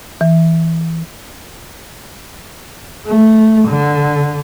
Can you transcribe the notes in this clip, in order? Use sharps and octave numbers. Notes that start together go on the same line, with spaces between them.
E3
A3
D3